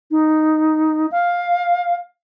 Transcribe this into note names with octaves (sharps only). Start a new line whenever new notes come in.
D#4
F5